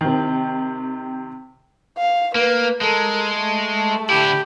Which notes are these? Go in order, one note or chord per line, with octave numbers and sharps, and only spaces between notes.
C3 D#3
F5
A#3 B4
G#3 A4 A#4
A3 A5
D3 E4 G4